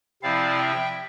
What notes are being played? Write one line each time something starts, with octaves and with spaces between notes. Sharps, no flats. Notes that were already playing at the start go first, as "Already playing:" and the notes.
C3 F3 C4 E4 D5 F5
E5 G5